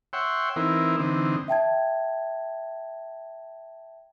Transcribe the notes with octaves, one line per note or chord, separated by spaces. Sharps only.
C#5 E5 F#5 G5 C6
E3 C4 D#4 E4 A#4
D3 E3 C4 D#4
E5 G5 A5 G#6